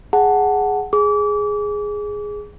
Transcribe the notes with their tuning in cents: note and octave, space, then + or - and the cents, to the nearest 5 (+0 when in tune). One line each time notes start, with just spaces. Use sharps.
G#4 +0 F#5 +5 A5 +10
G#4 +0 D6 -35